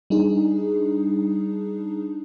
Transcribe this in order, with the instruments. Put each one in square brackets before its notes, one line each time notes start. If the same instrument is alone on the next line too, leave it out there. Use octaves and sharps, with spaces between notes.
[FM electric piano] G3 D4 D#4 G#4